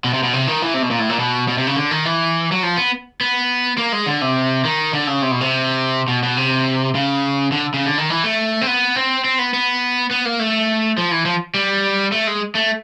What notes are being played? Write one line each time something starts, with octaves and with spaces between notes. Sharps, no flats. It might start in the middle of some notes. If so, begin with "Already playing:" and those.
B2
C3
B2
C3
D#3
E3
C3
B2
A#2
A2
A#2
B2
B2
C3
C#3
D3
D#3
E3
F#3
F3
B3
B3
A#3
G#3
D3
C3
D#3
D3
C#3
C3
B2
C3
B2
B2
C3
C#3
D3
C#3
D3
D#3
E3
A3
C4
B3
C4
C4
B3
B3
B3
A#3
A3
F3
E3
F3
G3
A3
G#3
A3